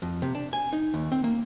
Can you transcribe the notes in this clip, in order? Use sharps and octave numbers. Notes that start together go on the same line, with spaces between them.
F2
C3
D4
G#5
D#4
D#2
C4
A#3